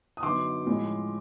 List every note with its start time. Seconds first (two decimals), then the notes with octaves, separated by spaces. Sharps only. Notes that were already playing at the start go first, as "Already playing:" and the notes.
0.17 D#6
0.23 F#2 D3 F#3 B3 D#4 C6 D6
0.66 A2 F3 G#3 C#4